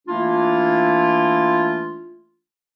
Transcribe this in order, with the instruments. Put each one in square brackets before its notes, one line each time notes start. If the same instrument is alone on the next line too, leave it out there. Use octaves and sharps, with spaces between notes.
[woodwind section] E3 A3 A#3 D4 E4 F4